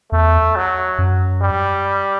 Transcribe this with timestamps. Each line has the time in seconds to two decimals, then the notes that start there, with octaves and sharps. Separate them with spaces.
0.12 E2 A3
0.56 F#3
0.98 F#2
1.42 G3